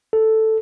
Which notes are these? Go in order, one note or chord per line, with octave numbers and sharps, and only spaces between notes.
A4